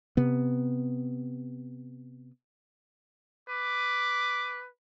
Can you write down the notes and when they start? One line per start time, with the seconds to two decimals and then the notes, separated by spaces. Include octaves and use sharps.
0.17 C3 B3
3.49 B4 D6